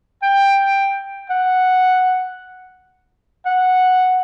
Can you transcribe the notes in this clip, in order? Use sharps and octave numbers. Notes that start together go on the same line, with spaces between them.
G5
F#5
F#5